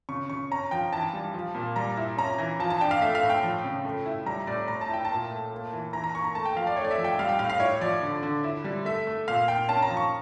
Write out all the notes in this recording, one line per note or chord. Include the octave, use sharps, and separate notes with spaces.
C#3 C#6
C#3 C#6
C#4 A#5
F3 G5
E3 A5
G3
F3
A#2
G3 A#5
E4
C#4 A#5
E3
F3 A5
A5
D4 G5
F5
A3 E5
F5
A2
G5
F3
C#3
A3
E4
G3 A#5
A2 D5
A2 A#5
A5
E4 G5
A5
A#2
A3
A#3
E3
E3 A#5
A#5
A#3 C#6
A#5
A3 A5
G5
F3 F5
D5
A3 C#5
D5
E5
F3
G5
G3 F5
G5
A2 F5
F5
E4 C#5
F3 D5
D3
D3
E4
G3
A3 E5
A3
A#2 F5
A#2 G5
C#4 A5
A#5
F3
C#6